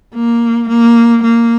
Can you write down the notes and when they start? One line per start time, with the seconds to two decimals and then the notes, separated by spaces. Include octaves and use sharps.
0.15 A#3
0.69 A#3
1.23 A#3